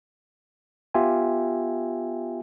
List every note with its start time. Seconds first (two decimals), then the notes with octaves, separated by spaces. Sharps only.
0.94 B3 F4 G4 E5 G5 G#5